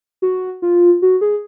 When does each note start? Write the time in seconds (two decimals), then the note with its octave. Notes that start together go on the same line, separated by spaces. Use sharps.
0.22 F#4
0.62 F4
1.02 F#4
1.21 G#4